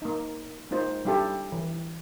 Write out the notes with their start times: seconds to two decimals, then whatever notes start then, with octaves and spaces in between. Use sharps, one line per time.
0.02 A#3 D#4
0.71 G#3 A#3 D#4 F4 C5
1.05 G3 D4 E4 G4 A4
1.52 E3